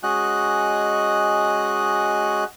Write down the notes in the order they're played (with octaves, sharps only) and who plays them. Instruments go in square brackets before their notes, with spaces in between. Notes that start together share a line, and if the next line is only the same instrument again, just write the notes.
[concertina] G#3 C#4 F#4 D#5 F#6